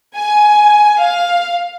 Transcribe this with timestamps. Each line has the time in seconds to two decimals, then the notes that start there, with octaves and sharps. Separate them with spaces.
0.15 G#5
1.01 F5